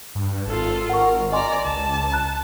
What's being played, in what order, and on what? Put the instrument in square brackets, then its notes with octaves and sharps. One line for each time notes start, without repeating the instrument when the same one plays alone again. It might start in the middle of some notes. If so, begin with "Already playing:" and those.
[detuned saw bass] G2
[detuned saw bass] G#1 [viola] F4 A4
[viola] A#4 [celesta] F#5 C#6
[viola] D5 A#5 [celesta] D#5 G#5 C6
[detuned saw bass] C#2 [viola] A5
[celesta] A#5 F#6